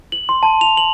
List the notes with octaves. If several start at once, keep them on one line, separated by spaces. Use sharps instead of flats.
F#7
C6
A5
F7
F#7